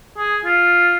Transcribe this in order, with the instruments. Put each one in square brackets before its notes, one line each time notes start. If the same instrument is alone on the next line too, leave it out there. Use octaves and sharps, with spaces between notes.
[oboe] G#4
F4